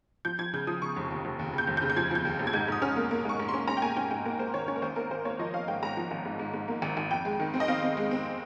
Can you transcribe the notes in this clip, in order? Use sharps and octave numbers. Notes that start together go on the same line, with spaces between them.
F3 G6
F3 G#6
C#3 G6
F3 D#6
C#3 C#6
F1
D#2
F1
D#2
C#3 G6
F1
G6
C#3
G6
F3 G#6
F3 G6
D#2
F1
G#6
G#2 G6
G#2 D#6
C#4 F6
A#3
A#3
G#2 C#6
G#2
C6
C#4
C#4 A#5
G5
A#3 G#5
C#4 G5
G#2 G5
A#3 A#4
A#3 C5
D#3 C#5
C#4 C#5
A#4
G#1 C5
A#3 A#4
G#1 C5
A#3 C#5
F3 D#5
F3 F5
G#2 G5
G#2 A#5
F3
G#1
G#2
G#2
G#2
A#3
G#1
G#1
F2 G5
G#3
D#3
C4
D#5
C4 F5
C4
G#3
C4